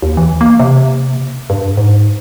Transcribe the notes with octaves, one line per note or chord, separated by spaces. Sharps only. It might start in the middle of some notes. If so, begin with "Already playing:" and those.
D#2
E3
A#3
C3
G2
G#2